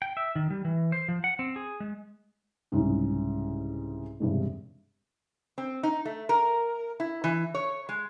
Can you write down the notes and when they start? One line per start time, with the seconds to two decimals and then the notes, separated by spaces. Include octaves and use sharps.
0.02 G5
0.17 E5
0.36 D#3
0.50 G3
0.65 E3
0.92 C5
1.08 F3
1.24 F#5
1.39 C4
1.56 G#4
1.80 G#3
2.72 C2 G#2 C#3
4.20 E1 G2 C3
5.58 C4
5.83 D#4
6.05 A3
6.29 A#4
7.00 E4
7.24 E3
7.54 C#5
7.89 G#3